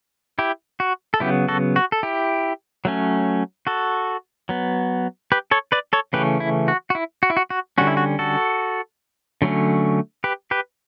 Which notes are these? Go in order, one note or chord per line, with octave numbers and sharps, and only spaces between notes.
E4 G4
F#4
A4
C#3 F#3 B3 E4 G4
F#4 A4
F#4
A4
E4 G4
F#3 A3 C#4
F#4 A4
F#3 B3
G4 B4
A4 C#5
B4 D5
A4 C#5
C#3 E3 A3 C#4 G4 B4
E4
F#4
F#4
E4
F#4
E4
F#4
F#4
D3 G3 C#4 F#4
E4
F#4
F#4 A4
D3 F#3 A3 C#4
G4 B4
G4 B4